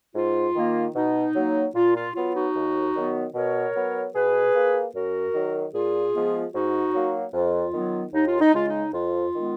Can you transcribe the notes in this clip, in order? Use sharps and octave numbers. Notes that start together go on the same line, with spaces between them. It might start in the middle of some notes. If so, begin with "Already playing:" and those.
G#2 F4
D#3 A#3
B2 D#4
F#3 A#3
A#2 F4
F4
F#3 B3 F4
D#4 F#4
D#2
D#3 F#3 B3
B2 A#4 C#5
F#3 B3
B2 G#4 B4
A#3
F#2 F#4 A#4
D#3 F#3
A#2 F4 G#4
F3 G#3 B3
G#2 D#4 F#4
F#3 A#3
F2 F4
D#3 F#3 B3
D#2 D#4
F4
D#4
C#3 G#3 F4
D#4
F2 F4
D#3 G#3 B3